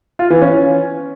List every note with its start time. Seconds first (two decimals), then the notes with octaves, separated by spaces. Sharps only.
0.19 F4
0.30 E3
0.42 C#4